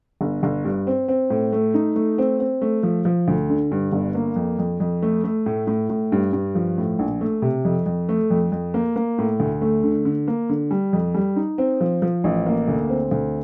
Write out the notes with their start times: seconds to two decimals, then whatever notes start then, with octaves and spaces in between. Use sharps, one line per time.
0.21 G1
0.43 G1
0.65 G2
0.87 C4
1.08 C4
1.30 A2
1.52 A3
1.74 D#4
1.96 A3
2.18 C4
2.40 C4
2.62 A3
2.83 F3
3.05 F3
3.28 D2
3.50 D3
3.72 G2
3.93 G1
4.15 A#3
4.36 F2
4.59 F2
4.80 F2
5.02 A3
5.24 A3
5.46 A2
5.67 A2
5.89 A2
6.12 G2
6.33 G2
6.55 F3
6.78 A2
6.99 A#1
7.21 A3
7.42 C3
7.65 F2
7.86 F2
8.09 A3
8.30 F2
8.52 F2
8.74 A#3
8.96 A#3
9.18 A2
9.40 D2
9.61 A3
9.84 D3
10.05 D3
10.28 A#3
10.49 D3
10.71 G3
10.93 F2
11.14 G3
11.36 D#4
11.58 C4
11.80 F3
12.02 F3
12.24 A1
12.46 A#3
12.68 D2
12.89 C4
13.11 D2